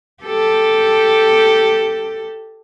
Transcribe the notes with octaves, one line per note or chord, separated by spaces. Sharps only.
G4 A4